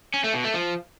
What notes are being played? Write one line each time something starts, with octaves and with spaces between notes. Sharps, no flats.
C#4
A3
B2
A3
F3